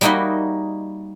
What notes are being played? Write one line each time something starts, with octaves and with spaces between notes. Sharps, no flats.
G3 A#3 D#4 E4 F#4 D#5